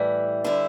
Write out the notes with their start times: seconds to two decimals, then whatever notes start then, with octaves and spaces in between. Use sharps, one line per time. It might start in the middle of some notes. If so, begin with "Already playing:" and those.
Already playing: A2 E3 G3
0.44 D3 G3 E4